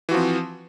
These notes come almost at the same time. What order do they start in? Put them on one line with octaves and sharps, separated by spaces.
E3 F#4 F3 C4